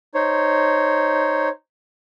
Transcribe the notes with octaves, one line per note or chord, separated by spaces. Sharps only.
D#4 C5 C#5